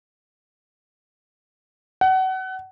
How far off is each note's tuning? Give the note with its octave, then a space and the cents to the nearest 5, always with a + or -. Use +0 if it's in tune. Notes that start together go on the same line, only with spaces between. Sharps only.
F#5 +30